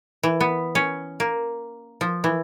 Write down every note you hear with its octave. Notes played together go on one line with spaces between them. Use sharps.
E3
B3
C#4
A#3
F3
E3